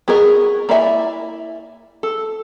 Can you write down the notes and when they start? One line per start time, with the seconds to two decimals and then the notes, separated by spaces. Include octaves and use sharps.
0.08 B3 F#4 G#4 A#4 D#5
0.69 A#3 E4 D5 E5 G#5
2.03 A4